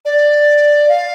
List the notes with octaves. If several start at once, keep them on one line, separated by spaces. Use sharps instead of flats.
D5
F5